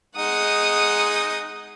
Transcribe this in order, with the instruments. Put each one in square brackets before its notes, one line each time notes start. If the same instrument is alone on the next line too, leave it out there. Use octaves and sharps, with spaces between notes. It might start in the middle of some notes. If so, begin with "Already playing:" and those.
[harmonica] G#3 D#4 [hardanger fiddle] F#5 D#6